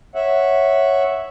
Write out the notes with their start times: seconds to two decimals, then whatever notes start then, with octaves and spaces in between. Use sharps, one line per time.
0.15 C#5 E5 F#5